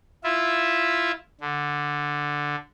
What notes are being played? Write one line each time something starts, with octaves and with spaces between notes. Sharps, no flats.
E4 F4 E5
D3